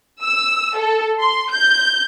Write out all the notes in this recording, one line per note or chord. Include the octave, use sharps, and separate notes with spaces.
E6
A4
C6
G6